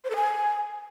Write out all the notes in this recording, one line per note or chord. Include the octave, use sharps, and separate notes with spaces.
C5
A4
G#5